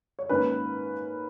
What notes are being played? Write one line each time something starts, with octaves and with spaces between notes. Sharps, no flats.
C#5
G#2 D#3 A#3 C#4 B4